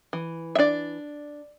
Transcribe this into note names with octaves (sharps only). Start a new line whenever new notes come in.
E3
E5
D4 D5